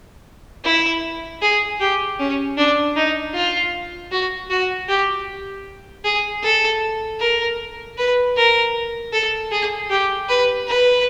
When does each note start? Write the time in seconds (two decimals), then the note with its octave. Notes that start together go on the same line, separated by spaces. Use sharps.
0.64 E4
1.42 G#4
1.80 G4
2.19 C#4
2.57 D4
2.96 D#4
3.34 F4
4.12 F#4
4.50 F#4
4.88 G4
6.05 G#4
6.43 A4
7.20 A#4
7.98 B4
8.36 A#4
9.13 A4
9.52 G#4
9.90 G4
10.29 B4
10.68 B4